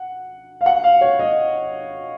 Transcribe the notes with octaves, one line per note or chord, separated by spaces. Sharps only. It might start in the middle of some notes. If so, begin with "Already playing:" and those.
Already playing: F#5
F5
F#5
F5
C#5
D#5